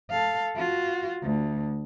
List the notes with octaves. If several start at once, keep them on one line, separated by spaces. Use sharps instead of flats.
A4 F5
F4 F#4
D2